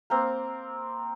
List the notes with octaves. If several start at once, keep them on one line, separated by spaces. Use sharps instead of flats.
A#3 C4